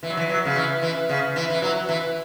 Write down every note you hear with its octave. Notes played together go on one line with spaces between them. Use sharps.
E3
F#3
E3
F#3
C#3
E3
E3
C#3
E3
E3
F#3
E3